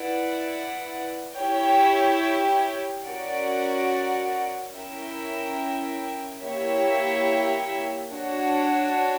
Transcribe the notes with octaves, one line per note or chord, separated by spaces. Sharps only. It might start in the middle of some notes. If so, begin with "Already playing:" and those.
Already playing: E4 B4 D5 F#5
E4 G4 C#5 G5
C#4 F#4 A#4 D5 F#5
C#4 E4 A#4 E5 G5
A#3 E4 G4 C#5 E5
D4 F#4 C#5